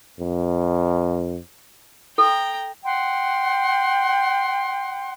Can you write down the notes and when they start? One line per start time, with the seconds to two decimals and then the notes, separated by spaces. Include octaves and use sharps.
0.20 F2
2.18 A4 G5 A#5
2.84 F#5 G5 C6